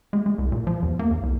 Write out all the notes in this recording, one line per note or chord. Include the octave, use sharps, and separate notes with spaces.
G#3
G#3
C2
A#2
F3
E2
A#3
E2
C2